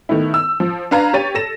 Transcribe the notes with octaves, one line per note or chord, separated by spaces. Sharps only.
D#3 A3 B3 E4
E6
F3
D4 B4 F5 A#5 G#6
G4 C#5 A6 D#7
A4 A#6 E7